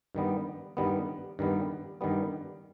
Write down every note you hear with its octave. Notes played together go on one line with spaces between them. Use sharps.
G2 D#3 G3 B3
G2 D#3 G3 B3
G2 D#3 G3 B3
G2 D#3 G3 B3